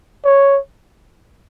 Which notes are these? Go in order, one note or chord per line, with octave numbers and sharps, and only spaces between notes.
C#5